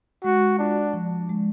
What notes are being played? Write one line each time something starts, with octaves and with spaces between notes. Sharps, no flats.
G#3 F#4
D4 F4
F3
G#3